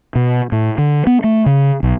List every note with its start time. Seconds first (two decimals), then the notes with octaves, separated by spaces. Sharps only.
0.15 B2
0.52 A2
0.78 D3
1.07 B3
1.24 A3
1.46 C#3
1.83 B1